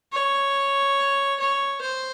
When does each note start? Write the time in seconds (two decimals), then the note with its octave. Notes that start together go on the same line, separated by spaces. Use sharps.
0.12 C#5
1.40 C#5
1.81 C5